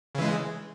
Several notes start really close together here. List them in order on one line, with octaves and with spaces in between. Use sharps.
C#3 E3 G#3